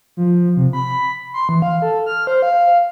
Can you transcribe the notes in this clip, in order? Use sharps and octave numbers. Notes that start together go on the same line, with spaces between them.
F3
C3
B5
C6
E3
F5
A4
F6
C5
F5